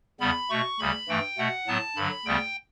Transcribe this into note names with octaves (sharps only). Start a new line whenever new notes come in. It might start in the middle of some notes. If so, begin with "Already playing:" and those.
E2 C#3 G3 B3 B5
B2 A3 C#6
D2 C#3 G3 B5
G2 E3 A3 G5
B2 A3 F#5
A2 F#3 B3 A5
G2 D3 F#3 B5
D2 C#3 G3 B3 G5